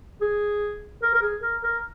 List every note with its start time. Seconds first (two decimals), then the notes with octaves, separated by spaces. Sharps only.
0.21 G#4
1.03 A#4
1.14 A#4
1.22 G#4
1.42 A#4
1.64 A#4